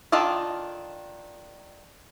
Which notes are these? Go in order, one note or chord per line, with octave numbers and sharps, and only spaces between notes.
D#3 D4 F4 A4 D#5